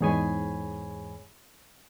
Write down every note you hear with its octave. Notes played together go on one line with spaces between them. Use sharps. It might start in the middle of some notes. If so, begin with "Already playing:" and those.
E2 G#2 G#4 C#5 G#5 B5